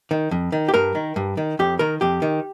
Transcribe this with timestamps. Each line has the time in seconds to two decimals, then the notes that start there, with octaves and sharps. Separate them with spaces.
0.11 D#3
0.31 F2
0.52 D#3
0.69 G4
0.74 G2 A#4
0.95 D#3
1.16 G2
1.37 D#3
1.59 F2 G4
1.79 D#3 A#4
2.01 F2 G4
2.22 D#3